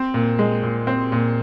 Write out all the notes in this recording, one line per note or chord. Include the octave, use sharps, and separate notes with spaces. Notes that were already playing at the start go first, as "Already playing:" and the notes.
Already playing: C4
A#2
G#3
A#2
C4
A#2